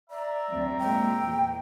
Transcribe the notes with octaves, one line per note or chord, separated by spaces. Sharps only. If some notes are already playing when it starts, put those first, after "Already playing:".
D5 E5 A#5
D2 F#3 C4
A#2 G#3 G5
E2 A2 G#3